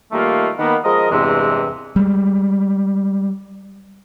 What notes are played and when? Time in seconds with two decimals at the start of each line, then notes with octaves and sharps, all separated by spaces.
0.12 D#3 G3 A3 A#3 D#4 F4
0.59 D#3 A#3 B3
0.84 F3 G#3 A#4 D#5
1.11 E2 G2 C3 E3 G#3 C4
1.96 G3 G#3